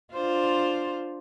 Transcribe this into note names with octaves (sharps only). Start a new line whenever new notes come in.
D4 F4 C5